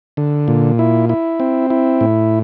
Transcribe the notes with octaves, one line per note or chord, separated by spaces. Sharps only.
D3
A#2
E4
E4
C4
E4
A2